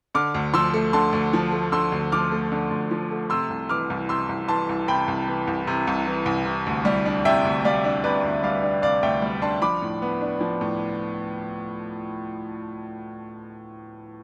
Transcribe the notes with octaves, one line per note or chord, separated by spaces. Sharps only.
D3 D6 F6
D2
F3 C6 E6
A3
D3 A5 C6
D2
F3
A3
D3 C6 E6
D2
F3 D6 F6
A3
D3
D2
F3
A3
C3 C6 E6
C2
E3 D6 F6
C2
C3 C6 E6
C2
E3 A5 C6
C2
C3 G5 B5
C2
E3
C2
C3
C2
E3
C2
C3
D2
G3
D4
C3 E5 G5
D2
G3 D5 F5
D4
C3 B4 D5
D2
G3 D5 F5
D4
C3 D5 F5
D2 E5 G5
G3
D4 A5 C6
F3 B5 D6
A2
B3
D4
F3
A2